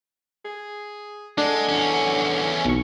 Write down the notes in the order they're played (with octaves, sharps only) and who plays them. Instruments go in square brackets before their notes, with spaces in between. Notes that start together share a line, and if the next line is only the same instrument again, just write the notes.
[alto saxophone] G#4
[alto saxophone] D3 [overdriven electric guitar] G#3 [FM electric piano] D4
[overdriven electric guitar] E2 C#4
[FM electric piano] B1 C#6